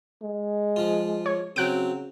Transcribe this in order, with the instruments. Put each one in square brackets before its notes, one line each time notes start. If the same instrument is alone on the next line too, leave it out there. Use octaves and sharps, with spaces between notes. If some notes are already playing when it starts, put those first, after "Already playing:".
[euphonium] G#3
[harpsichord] F3 F4
[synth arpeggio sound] C#5
[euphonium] C#3 [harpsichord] F#3 C4 [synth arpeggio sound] F#6 D7